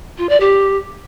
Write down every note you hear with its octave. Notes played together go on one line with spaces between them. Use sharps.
F4
D5
G4